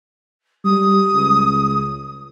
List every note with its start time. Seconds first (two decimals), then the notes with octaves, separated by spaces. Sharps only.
0.65 G3 D#6
1.13 C#2